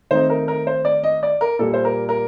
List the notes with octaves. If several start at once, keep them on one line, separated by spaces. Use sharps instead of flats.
D#3 A3 C4 D#4 C5
A#4
A#4
C5
D5
D#5
D5
A#4
A#2 G3 A#3 A4
C5
A#4
A#4